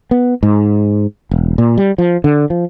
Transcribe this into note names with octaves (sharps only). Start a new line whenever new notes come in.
B3
G#2
E1
A#2
G3
F3
D3
F3